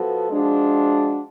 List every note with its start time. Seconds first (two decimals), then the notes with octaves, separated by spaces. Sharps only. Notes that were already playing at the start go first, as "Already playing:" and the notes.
Already playing: F3 B3 F#4 A4
0.30 F3 G#3 D4 F#4